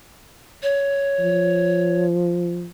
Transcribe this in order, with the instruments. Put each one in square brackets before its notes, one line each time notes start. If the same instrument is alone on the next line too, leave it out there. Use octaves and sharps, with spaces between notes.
[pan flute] C#5
[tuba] F3